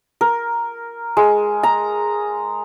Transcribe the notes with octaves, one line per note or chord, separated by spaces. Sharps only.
A#4
G#3
A#5